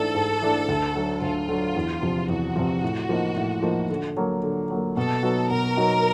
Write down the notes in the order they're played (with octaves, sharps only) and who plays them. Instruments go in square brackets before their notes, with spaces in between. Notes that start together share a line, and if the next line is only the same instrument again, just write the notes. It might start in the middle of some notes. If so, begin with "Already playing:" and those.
Already playing: [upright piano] G#2 E3 A3 D4 [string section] A4
[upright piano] G#2
E3 A3 D4
D2
D3 F#3
[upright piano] D2 [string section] F4
[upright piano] D3 F#3
E2
C3 F3
[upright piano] E2 [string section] F#4
[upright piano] C3 F3
A2
F3 A#3 D#4
A2
F3 A#3 D#4
D3
F#3 A#3
D3
F#3 A#3
[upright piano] B2 [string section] A4
[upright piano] F#3 B3 D#4 F#4
[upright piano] B2 [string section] A#4
[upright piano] F#3 B3 D#4 F#4